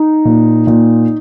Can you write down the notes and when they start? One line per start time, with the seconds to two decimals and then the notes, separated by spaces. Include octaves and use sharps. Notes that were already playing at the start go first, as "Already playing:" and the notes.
Already playing: D#4
0.25 A#2
0.67 A#2